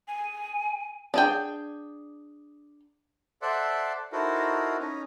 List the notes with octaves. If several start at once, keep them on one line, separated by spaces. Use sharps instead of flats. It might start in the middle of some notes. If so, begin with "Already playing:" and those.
G#5
D4 G#4 G5
A4 C5 D5 E5 F#5 C6
D#4 E4 F#4 A4 A#4 C5
C#4 D#4